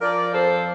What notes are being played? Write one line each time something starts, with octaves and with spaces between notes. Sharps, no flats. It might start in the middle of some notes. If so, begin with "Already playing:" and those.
F3 A#4 D5
F2 A4 C5